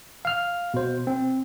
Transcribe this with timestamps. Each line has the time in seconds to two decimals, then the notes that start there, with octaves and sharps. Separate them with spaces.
0.25 F5 F6
0.74 B2 C5
1.07 C4